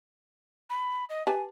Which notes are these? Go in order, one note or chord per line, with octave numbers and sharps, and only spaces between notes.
B5
D#5
G4 B4 G#5 A5